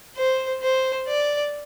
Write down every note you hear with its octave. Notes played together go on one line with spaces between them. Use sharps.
C5
C5
D5